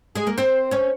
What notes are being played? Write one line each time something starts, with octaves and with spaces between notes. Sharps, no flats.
G#3 G#4
A#3 A#4
C4 C5
C#4 C#5